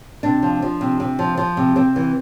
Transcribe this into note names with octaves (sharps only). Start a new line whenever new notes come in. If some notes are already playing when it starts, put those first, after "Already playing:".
C3 D4
F3
F3
C3
C3
F3
F3
C3
C3 C4
E3